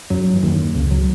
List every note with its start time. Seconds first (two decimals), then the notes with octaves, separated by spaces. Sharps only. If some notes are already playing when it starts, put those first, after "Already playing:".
0.10 F#2 F#3
0.36 E3
0.43 D#2 D#3
0.75 C#2 C#3
0.91 F#3